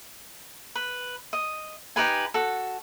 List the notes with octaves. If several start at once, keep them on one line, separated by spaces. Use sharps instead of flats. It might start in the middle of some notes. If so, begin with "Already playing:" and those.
B4
D#5
D#4 G4 B4 G#5
F#4 A4